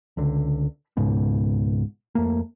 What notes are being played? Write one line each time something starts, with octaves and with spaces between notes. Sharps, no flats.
C#2 D3
C#2 G#2 B2
F2 A3 A#3